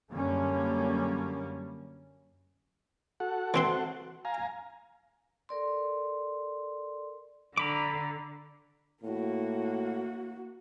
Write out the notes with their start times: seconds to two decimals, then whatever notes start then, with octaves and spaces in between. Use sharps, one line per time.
0.11 F#2 D3 G3 A#3 C#4
3.20 F#4 A4 F#5
3.54 E3 C4 C6
4.25 F5 G#5 A#5
5.49 A4 A#4 D5 C6
7.58 D3 A#5 B5 D6
9.03 A2 A#3 F#4